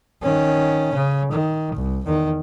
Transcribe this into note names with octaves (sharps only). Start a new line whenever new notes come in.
D#3 C#4
C#3
D#3
C2
E2 D#3